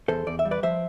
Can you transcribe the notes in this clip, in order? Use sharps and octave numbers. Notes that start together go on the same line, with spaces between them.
E2 A4 C5
E2 D5
E5
G3
B4 D5
F3 C5 E5